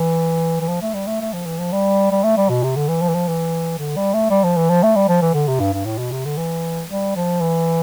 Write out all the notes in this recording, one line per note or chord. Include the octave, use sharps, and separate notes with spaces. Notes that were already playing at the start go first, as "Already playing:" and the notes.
Already playing: E3
E3
F3
A3
G3
A3
A3
F3
E3
F3
G3
G3
A3
G3
B2
C3
D3
E3
F3
E3
F3
E3
D3
G3
A3
G3
F3
E3
F3
A3
G3
F3
E3
D3
C3
G2
G2
A2
B2
C3
D3
E3
G3
F3
E3